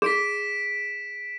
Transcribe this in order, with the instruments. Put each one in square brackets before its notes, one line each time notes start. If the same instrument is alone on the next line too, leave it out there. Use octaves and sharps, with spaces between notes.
[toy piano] G#4 [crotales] B6 D7 E7